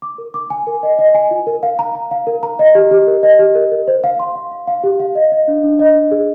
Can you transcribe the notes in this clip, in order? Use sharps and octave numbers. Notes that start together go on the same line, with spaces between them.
D6
A#4
D6
G#5
A#4
D#5
D#5
G#5
F4
A#4
F5
A#5
A#5
F5
A#4
A#5
D#5
G4
G4
A#4
D#5
G4
A#4
A#4
C5
F5
C6
F5
F5
F5
G4
F5
D#5
D#5
D4
D4
D#5
D4
G#4